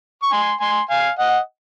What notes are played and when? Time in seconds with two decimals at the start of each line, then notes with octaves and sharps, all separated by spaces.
0.23 C#6
0.32 G#5 C6
0.60 G#5 C6
0.90 F5 G#5
1.19 D#5 F#5